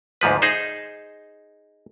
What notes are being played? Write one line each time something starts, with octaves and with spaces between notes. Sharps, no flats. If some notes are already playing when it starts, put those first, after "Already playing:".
D2 G#2 F3 B4
D#4 G#4 C5